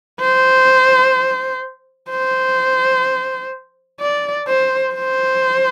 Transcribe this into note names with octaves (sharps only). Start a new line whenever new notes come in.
C5
C5
D5
C5
C5